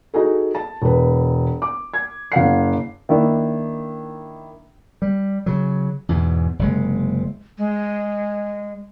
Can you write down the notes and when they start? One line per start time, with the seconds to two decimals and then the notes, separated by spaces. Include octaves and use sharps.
0.14 D#4 F#4 G#4 A4
0.55 A5
0.82 E1 B4
1.62 D6
1.94 G#6
2.32 F#1 F5 F#5 C7
3.09 D#3 A#3 D4 E4
5.02 G3
5.46 C#3 F#3
6.09 E2 G#2 B2
6.59 F#1 C3 G#3
7.58 G#3